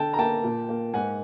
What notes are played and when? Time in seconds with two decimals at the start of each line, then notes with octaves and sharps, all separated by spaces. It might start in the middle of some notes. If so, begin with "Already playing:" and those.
Already playing: D3 G5 A5
0.13 A#5
0.19 A#3 G5 A5
0.44 A#2
0.69 A#3
0.94 G#2 F#5 G#5